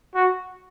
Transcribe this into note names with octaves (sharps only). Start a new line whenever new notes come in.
F#4